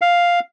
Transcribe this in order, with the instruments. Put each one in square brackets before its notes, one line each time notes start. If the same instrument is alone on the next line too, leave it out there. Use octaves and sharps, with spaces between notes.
[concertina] F5